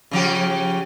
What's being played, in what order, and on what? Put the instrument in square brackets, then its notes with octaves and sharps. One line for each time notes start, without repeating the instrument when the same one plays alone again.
[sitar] C#3 F3 G4